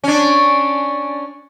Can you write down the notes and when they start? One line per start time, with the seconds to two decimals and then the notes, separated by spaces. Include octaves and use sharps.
0.04 C#4 D4